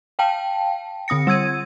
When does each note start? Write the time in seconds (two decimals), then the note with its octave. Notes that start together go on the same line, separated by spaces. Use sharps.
0.19 F5 G5 A5
1.08 D3 C4 D#6 A#6 C#7
1.27 G3 E6 G#6 D#7